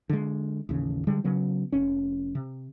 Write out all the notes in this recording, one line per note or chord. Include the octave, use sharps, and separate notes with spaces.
D3 G#3
A1 D#2 C#3
D3 G3 G#3
C#3 F#3 B3
F1 C#4
C3